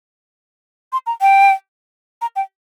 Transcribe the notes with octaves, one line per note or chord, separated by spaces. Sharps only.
C6
A#5
G5
A#5
G5